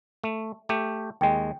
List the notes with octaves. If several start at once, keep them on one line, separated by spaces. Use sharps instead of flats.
A3
A3 G4
D#2 G#3 G5